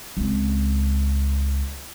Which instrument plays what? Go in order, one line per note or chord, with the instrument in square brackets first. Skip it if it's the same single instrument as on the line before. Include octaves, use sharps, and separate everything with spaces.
[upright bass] C#2 C4